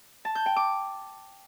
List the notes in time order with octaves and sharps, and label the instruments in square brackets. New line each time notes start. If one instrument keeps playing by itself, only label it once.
[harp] A5
G6
G5
D6